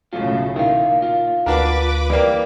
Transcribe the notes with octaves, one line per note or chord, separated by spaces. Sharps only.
B1 A2 C#3 F#3 F4
A#2 D#3 E4 F5
F4
D2 D4 F#4 A#4 B4 D6
E3 G3 A#3 D5